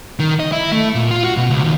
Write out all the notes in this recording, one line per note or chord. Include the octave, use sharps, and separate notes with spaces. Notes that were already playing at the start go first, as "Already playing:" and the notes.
D#3
D#5
E4
A3
A#2
F4
F#4
B2
C#2
D#2